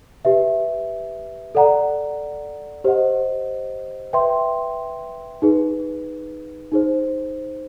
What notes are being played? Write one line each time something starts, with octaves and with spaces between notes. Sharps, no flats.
G4 B4 E5
A4 D5 F#5 A#5
G4 C5 D#5 F#5
B4 E5 G5 C6
D#4 G#4 B4
D#4 G#4 C5